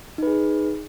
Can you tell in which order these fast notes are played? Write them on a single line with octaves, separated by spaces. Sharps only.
D#4 B4 G#4